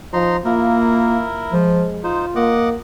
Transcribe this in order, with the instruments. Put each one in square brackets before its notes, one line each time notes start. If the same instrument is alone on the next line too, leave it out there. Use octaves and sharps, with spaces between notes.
[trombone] F3 [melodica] D#4 A#5 C6
[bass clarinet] A#3 [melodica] E4 A#4 [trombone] F4
[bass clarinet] F3 [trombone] G#3
[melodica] D#4 C5 [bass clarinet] F4
[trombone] A#3 [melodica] D#5 F#5 D6